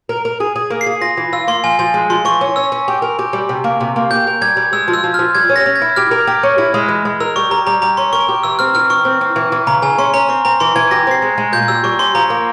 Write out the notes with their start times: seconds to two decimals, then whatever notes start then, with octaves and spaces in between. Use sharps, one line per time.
0.09 A#4
0.25 A#4
0.40 G#4
0.56 G#4
0.70 A#3
0.81 C7
0.86 G#4
1.01 F4 A#6
1.17 E3
1.33 F4 E6
1.48 A#3 C6
1.64 F3 G#5
1.79 F3 G#5
1.94 G#3
2.10 F3 C6
2.25 E3 C#6
2.41 C#4
2.56 C#4 E6
2.72 C#4
2.88 G4
3.02 A#4
3.19 G4
3.33 G3
3.49 C3
3.64 A#3
3.80 C3
3.96 A#3
4.11 G4 G6
4.27 A#4
4.41 G3 G#6
4.57 G3
4.73 G#3 E6
4.88 F3
4.93 E6
5.04 F3
5.14 F6
5.19 F3
5.35 G3 G#6
5.49 C#4
5.56 A#6
5.66 C#4
5.76 G#6
5.82 E4
5.96 G4 F6
6.11 A#4
6.27 G4
6.43 C#4
6.58 E4
6.74 G#3
6.89 E3
7.05 G#3
7.20 A#4 E6
7.36 G3 C#6
7.51 G3 A#5
7.67 G3 A#5
7.82 G3 A#5
7.97 C#4 C6
8.13 A#4 C#6
8.28 G4
8.43 E3 E6
8.59 C4 F6
8.75 E3 F6
8.90 E3 C#6
9.05 C4
9.21 C4
9.36 E3
9.52 E3
9.67 C#3 A#5
9.82 C#3 G#5
9.98 C#4 C6
10.14 C#4 A#5
10.29 C4 C#6
10.45 C4 A#5
10.60 E3 C6
10.76 E3 G#6
10.91 G4 A#6
11.07 C4 C7
11.22 G#3
11.38 G#3
11.53 A#2 G6
11.68 G3 E6
11.84 G3 C#6
11.99 C#4 C6
12.15 F3 A#5
12.30 A#3